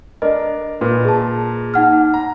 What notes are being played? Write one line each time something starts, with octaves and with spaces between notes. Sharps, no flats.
D4 A#4 D#5
A#2 A#4 B4
G#4 A5
D#4 F#5 F6
A#5